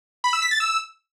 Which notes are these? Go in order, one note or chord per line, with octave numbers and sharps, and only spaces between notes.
B5
E6
B6
A6
E6